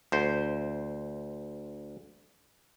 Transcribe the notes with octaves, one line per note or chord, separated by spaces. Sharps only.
D2 C5